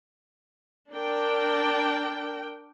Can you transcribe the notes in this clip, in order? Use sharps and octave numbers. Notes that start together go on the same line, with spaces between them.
D4 A#4 G5